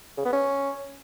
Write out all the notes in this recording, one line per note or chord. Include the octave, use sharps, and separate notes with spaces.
C#3
B3
C#4